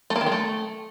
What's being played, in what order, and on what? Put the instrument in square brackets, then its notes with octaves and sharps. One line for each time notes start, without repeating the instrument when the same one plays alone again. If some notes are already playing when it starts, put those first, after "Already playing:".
[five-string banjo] A3
A#3
D#3
G#3
A3